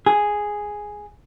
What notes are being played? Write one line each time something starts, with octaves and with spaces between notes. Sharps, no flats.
G#4